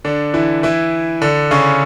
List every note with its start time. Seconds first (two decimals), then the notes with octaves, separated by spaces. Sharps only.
0.05 D3 D4
0.34 E3 E4
0.63 E3 E4
1.22 D3 D4
1.51 C#3 C#4